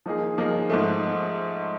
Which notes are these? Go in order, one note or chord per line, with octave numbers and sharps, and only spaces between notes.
F3 A#3 D#4 G#4
F3 A#3 D#4 G#4
G#2 F3 A3